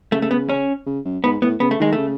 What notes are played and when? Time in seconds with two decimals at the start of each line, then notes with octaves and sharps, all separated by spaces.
0.12 C#3 A3
0.22 A3
0.31 B3
0.49 C#4
0.86 C#3
1.05 F#2
1.24 G#2 B3
1.42 A2 B3
1.60 C#3 B3
1.71 A3
1.80 D#3 G#3
1.93 C#3 A3